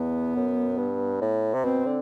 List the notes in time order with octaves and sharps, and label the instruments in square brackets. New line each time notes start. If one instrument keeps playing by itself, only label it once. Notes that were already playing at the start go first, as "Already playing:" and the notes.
Already playing: [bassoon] E2 [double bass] B3
[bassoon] F#2
G2
A2
C3
[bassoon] B2 [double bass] C4
[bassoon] D3